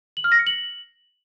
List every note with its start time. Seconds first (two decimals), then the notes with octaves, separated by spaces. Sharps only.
0.17 F#7
0.24 F6
0.32 A#6
0.39 C#7
0.47 F#7